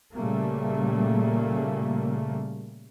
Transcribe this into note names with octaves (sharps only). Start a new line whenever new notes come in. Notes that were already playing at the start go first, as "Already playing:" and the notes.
A#2 C#3 G3 A3 A#3